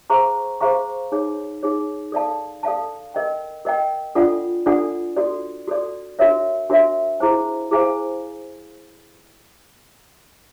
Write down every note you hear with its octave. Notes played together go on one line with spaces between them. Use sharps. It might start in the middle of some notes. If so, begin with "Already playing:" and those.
G#4 C5 F5 A#5 C#6
G#4 C5 F5 A#5 C#6
D#4 G#4 C#5
D#4 G#4 C#5
A4 D5 F5 A5
A4 D5 F5 A5
A#4 D#5 G5
A#4 D#5 G5
D4 F4 A4 D5 F#5
D4 F4 A4 D5 F#5
F#4 A4 D5
F#4 A4 D5
D4 F#4 A#4 C#5 E5
D4 F#4 A#4 C#5 E5
E4 G#4 C5 F5 G#5
E4 G#4 C5 F5 G#5